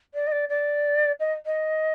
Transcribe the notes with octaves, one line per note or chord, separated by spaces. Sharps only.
D5
D#5
D5
D5
D#5
D#5